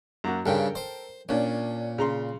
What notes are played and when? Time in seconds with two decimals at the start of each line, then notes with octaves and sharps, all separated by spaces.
0.24 F#2 A#3 F#4
0.46 G2 C#3 A4 A#4 G5
0.75 C5
1.29 A#2 C#4 D4
1.98 C#3 A#5 C6